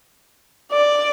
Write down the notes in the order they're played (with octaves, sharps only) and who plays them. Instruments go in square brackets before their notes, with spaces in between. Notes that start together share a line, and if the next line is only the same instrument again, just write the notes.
[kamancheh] D5